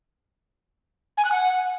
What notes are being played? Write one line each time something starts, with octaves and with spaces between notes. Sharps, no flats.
G#5
F#6
F#5